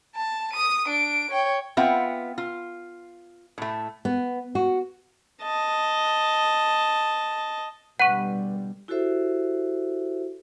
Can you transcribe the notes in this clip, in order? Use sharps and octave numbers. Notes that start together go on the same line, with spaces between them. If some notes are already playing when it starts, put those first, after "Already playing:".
A5
D#6 D#7
D4 D7
C#5 G5
B3 C4 F4 E5 F#5 G5
F4
A2 A3
B3
F#4
D#5 A5
B2 D3 G3 B4 F#5 C#6
E4 F#4 G4 A4 C5 E5